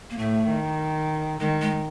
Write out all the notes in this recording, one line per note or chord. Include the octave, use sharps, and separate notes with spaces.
A#3
A2 A3
D#3
D#3 G#3
G#3